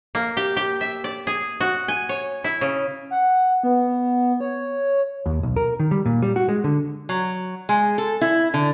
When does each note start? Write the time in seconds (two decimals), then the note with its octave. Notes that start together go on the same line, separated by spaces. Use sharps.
0.15 A#3
0.37 G4
0.57 G4
0.81 E5
1.04 D5
1.27 G#4
1.60 F#4
1.88 G#5
2.09 C#5
2.44 E4
2.61 C#3
3.11 F#5
3.63 B3
4.40 C#5
5.26 D#2
5.43 B1
5.56 A#4
5.80 D#3
5.91 G3
6.05 A#2
6.22 G3
6.36 F#4
6.49 G#3
6.64 D3
7.09 F#3
7.69 G#3
7.98 A4
8.21 E4
8.54 D3